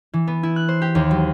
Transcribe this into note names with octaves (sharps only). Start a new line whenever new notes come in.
E3
B3
E4
F#6
C5
G4
D#2
F#3